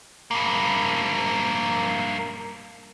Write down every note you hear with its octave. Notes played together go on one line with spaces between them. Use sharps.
G2 A#3